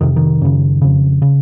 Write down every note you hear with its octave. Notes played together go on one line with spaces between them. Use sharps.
F2 C3 D#3
D#3
F#2 C#3
F2 C#3
C#3